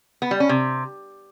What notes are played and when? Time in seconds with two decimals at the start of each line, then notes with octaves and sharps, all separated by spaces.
0.22 B3
0.31 G3
0.40 C#4
0.49 C3